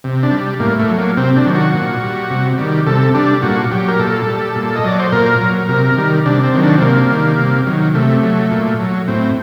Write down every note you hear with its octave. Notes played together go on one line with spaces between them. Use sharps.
C3
D4
G3
A2 A#3
A3
F#3
A#3
C3 C4
D4
D#3 F#3
F#4
A#2
G3
C3
D#3 G3
C3 A4
G3 D4
A#2 F#4
F#3 G4
A#4
A#2 A4
G3
A#2
D#5
F#3 D5
C5
A#2 A#4
F#3
C3 A#4
D#3 G3
C3 D4
C4
D#3 F#3
D4
C4
C3 A#3
D#3 G3
C3
D#3 F#3
C3 A3
F#3
A#2
F#3
A2 C4